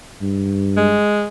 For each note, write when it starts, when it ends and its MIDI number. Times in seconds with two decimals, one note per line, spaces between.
0.22 0.99 43
0.77 1.28 56